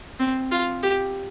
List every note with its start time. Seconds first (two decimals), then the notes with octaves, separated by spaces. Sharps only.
0.20 C4
0.51 F4
0.83 G4